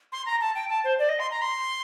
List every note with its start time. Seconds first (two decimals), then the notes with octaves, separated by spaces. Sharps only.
0.12 C6
0.26 A#5
0.41 A5
0.55 G5
0.69 A5
0.84 C5
0.99 D5
1.09 D#5
1.19 C6
1.31 A#5
1.42 C6